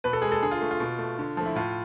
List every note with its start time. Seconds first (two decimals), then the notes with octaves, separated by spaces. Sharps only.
0.04 B2 B4
0.13 A4
0.22 G#3 G#4
0.32 A4
0.42 D3 G#4
0.51 F4
0.61 A3
0.71 F4
0.80 B2
0.99 A3
1.19 D3
1.37 F3 A3
1.46 E4
1.55 A2 F4